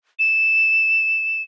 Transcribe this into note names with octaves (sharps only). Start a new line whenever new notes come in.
E7